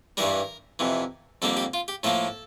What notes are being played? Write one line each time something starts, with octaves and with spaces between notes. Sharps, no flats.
G2 E3 G3 A#4
F2 C3 E3
F2 D3 G3 A#3 A4
G4
F4
G4
A2 F3 A#3 A4